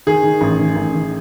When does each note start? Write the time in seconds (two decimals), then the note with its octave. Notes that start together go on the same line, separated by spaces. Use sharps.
0.07 D#3 G#4
0.23 D#3
0.41 A1
0.59 D#3
0.76 A1
0.94 D#3